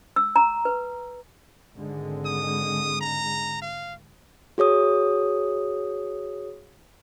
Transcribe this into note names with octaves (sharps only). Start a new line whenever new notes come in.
E6
A#5
B4
G#1 D3 G#3
D#6
A#5
F5
F#4 G#4 C#5 D#6